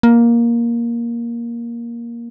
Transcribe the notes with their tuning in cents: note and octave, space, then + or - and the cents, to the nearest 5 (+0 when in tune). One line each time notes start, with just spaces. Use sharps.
A#3 +10